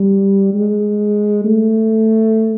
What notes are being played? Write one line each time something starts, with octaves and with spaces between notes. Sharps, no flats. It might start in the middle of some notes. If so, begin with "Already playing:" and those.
Already playing: G3
G#3
A3